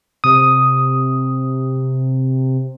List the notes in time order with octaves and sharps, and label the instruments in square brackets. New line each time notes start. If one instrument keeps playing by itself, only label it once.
[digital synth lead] C3 [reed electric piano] D#6